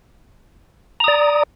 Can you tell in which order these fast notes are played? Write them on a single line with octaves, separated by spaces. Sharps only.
A#5 D#6 D5